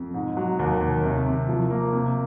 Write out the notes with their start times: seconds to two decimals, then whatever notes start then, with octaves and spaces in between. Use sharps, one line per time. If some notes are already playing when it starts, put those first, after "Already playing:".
Already playing: F2
0.14 G#2
0.37 F#3
0.59 D#2
0.81 D#2
1.03 C3
1.26 C3
1.48 F3
1.70 A#3
1.93 C3